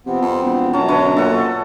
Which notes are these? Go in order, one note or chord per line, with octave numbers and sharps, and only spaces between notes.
C3 F3 B3 C4
F2
E1
F#2 B2 C#4 A5 A#5
D3 B4 C#5 A5
A#2 A4 F#5